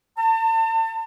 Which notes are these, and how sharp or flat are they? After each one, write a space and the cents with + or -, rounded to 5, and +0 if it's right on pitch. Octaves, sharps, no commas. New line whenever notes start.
A5 +40